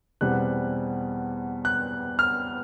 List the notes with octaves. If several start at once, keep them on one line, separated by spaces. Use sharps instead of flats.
E2 B2 G3 C4 F#6
F#6
F6